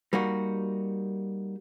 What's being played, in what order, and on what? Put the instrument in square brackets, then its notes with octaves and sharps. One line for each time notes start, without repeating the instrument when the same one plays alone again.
[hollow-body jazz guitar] G3 A#3 D#4 F#4